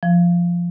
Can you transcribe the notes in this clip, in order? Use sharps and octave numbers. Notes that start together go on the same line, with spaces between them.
F3